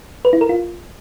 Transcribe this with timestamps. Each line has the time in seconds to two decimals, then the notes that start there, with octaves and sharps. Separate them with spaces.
0.25 B4
0.33 E4
0.41 A#4
0.49 F4